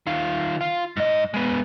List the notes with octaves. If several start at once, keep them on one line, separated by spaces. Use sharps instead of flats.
D#3 F4
F4
G#2 D#5
G#3 B3